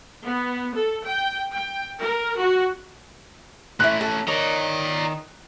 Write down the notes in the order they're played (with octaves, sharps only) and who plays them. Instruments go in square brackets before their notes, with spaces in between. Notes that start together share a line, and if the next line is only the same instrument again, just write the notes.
[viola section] B3
A4
G5
G5
A#4
F#4
[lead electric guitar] A3 C#4 [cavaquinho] E4 C6 [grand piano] F#6
[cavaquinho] A4
[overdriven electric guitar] D#3 [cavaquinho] C#5 [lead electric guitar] D5 A#5